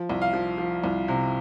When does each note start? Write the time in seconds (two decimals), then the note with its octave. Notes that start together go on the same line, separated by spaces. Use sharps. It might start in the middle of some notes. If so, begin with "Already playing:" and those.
Already playing: F3
0.10 C2
0.21 F5
0.33 F3
0.58 F3
0.84 C2
1.08 C3